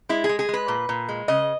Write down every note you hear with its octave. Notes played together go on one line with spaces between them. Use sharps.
G#3 E4
G#4
G#3
G#4
G#3 B4
A#2
A#2
G#3
C#3 D#5